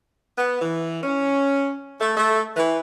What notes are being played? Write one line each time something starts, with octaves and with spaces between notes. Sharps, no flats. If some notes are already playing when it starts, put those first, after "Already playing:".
B3
E3
C#4
A3
A3
E3